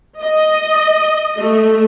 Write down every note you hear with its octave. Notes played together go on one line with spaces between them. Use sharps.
D#5
A3